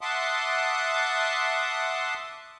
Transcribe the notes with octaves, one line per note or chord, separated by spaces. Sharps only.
E5 F#5 A5 C6 D6 D#6